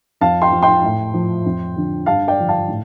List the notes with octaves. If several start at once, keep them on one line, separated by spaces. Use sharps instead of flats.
F2 F5 A5
G5 C6
F3
G5 C6
A2
F3
F2
D3 F3
G2 F5 A5
D5 G5
D3 F3
F5 A5
A2